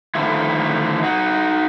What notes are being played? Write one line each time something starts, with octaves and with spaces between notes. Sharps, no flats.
D3 D#3 F3 A3 E4
D#4 F#4